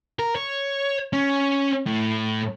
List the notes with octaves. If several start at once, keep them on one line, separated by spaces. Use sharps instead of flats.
A#4
C#5
C#4
A2